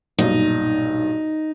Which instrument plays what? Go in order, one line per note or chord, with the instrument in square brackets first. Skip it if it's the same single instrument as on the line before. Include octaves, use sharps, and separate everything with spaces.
[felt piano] B1 G2 A#2 [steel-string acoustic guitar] D#4